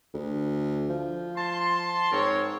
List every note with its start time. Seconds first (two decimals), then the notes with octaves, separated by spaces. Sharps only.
0.14 D2
0.89 F3
1.36 A5 C6
2.12 G#2 C4 A#4 C#5